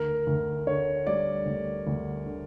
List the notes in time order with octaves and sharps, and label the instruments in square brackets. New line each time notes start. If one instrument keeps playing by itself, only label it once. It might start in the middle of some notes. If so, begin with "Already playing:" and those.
Already playing: [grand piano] D2 A#4
D2
D3 C#5
G3 D5
D2
D2
D3